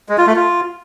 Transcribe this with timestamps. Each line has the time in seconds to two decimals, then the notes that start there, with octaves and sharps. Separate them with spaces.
0.09 G#3
0.18 F4
0.27 A3
0.36 F4